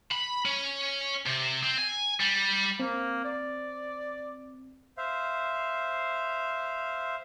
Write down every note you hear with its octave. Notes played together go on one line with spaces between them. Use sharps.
B5
C#4
C3
C4
G#5
G3
A#3 C4
D5
C5 E5 F5